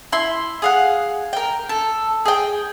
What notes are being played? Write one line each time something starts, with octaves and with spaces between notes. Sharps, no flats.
E4 C6
G#4 F5 F#5
A#4 G5
A4
G#4 G5